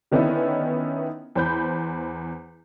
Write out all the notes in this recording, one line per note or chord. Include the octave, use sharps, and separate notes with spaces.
D3 D#3 B3 C#4 D#4 E4
E2 C5 B5 G6